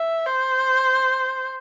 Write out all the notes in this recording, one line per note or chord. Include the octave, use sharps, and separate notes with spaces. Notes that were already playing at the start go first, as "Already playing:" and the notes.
Already playing: E5
C5